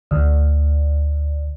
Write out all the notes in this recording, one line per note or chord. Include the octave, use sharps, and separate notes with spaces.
D2